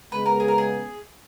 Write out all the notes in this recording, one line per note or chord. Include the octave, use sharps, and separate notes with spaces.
C#3 G#3 B3 B4
A#4
G#4
A#4
G#4